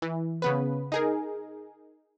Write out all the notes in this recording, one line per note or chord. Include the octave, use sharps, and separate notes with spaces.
E3
C#3 B3 B4
D#4 G#4 A#4